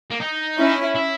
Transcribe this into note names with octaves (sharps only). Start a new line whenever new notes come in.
A#3
D#4
C#4 E4
E4